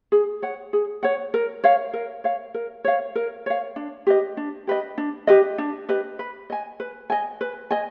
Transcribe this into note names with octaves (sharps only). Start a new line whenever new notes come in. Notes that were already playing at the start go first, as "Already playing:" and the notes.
G#4
C#5 F#5
G#4
C#5 F#5
A#4
C#5 F5
A#4
C#5 F5
A#4
C#5 F5
A#4
C#5 F5
D4
G4 B4 D#5
D4
G4 B4 D#5
D4
G4 B4 D#5
D4
G4 B4 D#5
B4
D#5 G#5
B4
D#5 G#5
B4
D#5 G#5